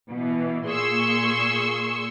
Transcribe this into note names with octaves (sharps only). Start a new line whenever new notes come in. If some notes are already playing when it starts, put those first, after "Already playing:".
B2 E3
A#2 G#4 C6 C#6 E6